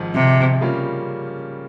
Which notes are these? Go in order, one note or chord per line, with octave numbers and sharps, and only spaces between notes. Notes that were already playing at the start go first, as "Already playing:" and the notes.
Already playing: G#1 G#2 F3
C3
C#3 G3 A#3 C#4 F4